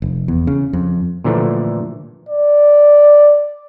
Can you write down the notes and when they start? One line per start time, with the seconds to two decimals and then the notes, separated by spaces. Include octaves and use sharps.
0.02 F1
0.28 E2
0.47 C#3
0.73 F2
1.24 A#2 D3 E3 F3 A3
2.29 D5